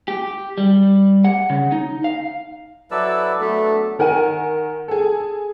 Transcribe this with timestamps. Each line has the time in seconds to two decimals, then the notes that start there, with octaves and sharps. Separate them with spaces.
0.08 G4
0.58 G3
1.24 F#5
1.50 C#3
1.72 D#4
2.04 F5
2.91 F#3 E4 A4 B4 D5 E6
3.41 F#3 A3 B3 D4 A4
3.99 D#3 A#4 F#5 G#5 D#7
4.88 G#4 A4